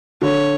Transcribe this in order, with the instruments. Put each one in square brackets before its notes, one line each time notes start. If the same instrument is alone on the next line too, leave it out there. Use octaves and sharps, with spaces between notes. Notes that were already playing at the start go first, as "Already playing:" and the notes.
[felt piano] D3 [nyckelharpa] C#5